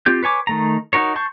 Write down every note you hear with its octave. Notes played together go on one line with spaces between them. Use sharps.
C4 F4 G4 G6
B4 C#5 G#5 D6
D#3 A3 A#5
D#4 F#4 A#4 C#5
A5 C6 C#6 G6